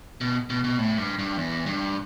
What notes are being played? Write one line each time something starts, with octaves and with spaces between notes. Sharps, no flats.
B2
B2
B2
A2
G2
G2
E2
G2